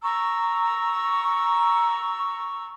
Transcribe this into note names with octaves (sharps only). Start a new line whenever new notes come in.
A#5 C#6 E6